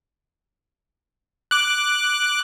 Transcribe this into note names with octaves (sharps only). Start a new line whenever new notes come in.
D6 F#6